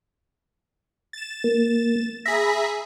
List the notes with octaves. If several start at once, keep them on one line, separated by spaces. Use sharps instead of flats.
A6 E7
A#3
G#4 E5 A#5 B5